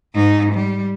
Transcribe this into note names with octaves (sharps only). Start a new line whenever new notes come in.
G#2 D#4
G3